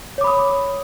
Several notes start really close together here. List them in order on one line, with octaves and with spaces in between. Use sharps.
C#5 D6 B5 D#6